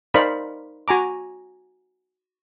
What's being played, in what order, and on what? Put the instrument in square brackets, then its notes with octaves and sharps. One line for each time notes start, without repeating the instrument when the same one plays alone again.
[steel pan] D#4 A#4 C5 D5 F5 B5
F#4 G#5 A#5 D6